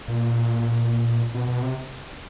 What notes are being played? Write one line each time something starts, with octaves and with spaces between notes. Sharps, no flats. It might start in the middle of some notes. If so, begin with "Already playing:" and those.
A#2
B2
B2
C3